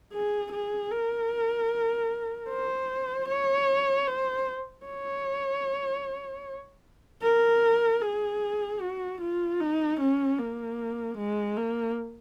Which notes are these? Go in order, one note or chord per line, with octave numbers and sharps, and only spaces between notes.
G#4
G#4
A#4
C5
C#5
C5
C#5
A#4
G#4
F#4
F4
D#4
C#4
A#3
G#3
A#3